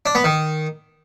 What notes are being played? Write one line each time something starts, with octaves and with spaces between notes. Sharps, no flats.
D4
B3
D#3